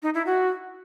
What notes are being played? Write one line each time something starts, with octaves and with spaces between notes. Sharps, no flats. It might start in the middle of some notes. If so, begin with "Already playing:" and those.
D#4
E4
F#4